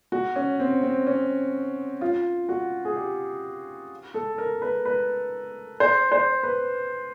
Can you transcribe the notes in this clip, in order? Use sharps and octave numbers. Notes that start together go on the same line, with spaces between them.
F#4
C#4
C4
C4
C#4
F4
F#4
G#4
G4
A4
A#4
B4
B4
C5
C5
B4